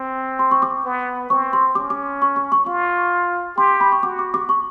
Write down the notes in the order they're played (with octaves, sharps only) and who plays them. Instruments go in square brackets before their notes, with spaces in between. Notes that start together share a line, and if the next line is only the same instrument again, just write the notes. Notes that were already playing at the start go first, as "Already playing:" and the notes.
Already playing: [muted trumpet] C4
[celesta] C6
C#6
D6
[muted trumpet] B3
[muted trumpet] C4 [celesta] C#6
[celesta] C6
[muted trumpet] C#4 [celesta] D6
[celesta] D6
C#6
C#6
C#6
[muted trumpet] F4 [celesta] C#6
[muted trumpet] G4 [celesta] C6
[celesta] B5
C#6
[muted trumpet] F#4 [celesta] D6
[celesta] D6
D6
C#6